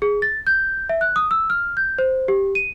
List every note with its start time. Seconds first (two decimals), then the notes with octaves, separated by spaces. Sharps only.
0.02 G#4
0.22 A6
0.47 G6
0.89 E5
1.01 F#6
1.16 D#6
1.31 E6
1.50 F6
1.77 G6
1.98 C5
2.28 G4
2.55 D#7